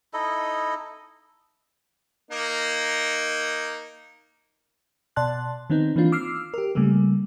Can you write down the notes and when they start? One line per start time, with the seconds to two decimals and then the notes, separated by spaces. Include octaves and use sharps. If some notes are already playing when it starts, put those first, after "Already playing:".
0.13 D#4 E4 A4 D#5
2.31 A#3 D#4
5.16 B2 D5 A5 C6 F#6
5.70 D#3 B3 C4 D#4
5.96 E3 A#3 C4 D4 F4
6.12 D6 E6 F6 C7
6.54 G4 A#4
6.75 C#3 G3 A3 A#3